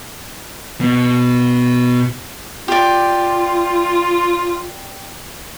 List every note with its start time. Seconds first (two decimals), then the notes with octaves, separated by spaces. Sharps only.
0.81 B2 B3
2.68 F4 G4 D5